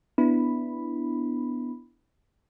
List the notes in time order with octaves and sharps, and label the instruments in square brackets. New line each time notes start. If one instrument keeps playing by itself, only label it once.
[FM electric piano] B3 D4 E4 B5